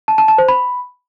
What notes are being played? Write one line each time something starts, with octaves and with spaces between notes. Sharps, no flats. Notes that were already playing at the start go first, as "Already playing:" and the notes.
A5
A5
A5
C5
B5